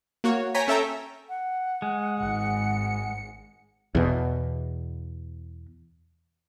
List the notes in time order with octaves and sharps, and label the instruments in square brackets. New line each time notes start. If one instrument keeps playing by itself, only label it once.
[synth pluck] A#3 F#4 C#5
C#5 G5 G#5 A#5 B6
C#4 A4 E5 G5 A#5
[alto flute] F#5
[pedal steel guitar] G#3
[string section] G#1 G#2 C#7
[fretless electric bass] E2 B2